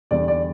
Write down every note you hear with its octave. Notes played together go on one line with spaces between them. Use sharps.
E2 D3 G3 D5
D5